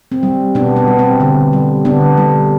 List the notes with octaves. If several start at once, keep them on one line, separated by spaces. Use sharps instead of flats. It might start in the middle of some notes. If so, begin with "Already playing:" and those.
C4
G3
B2 B3 D4
B3
G3
C4
D3
G3
D3 B3 D4
G3